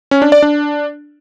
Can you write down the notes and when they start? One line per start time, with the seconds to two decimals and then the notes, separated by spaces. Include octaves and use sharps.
0.11 C#4
0.22 D4
0.32 D5
0.42 D4